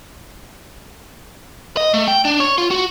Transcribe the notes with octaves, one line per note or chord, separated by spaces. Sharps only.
D#5
A3
G5
D4
C#5
F4
F#4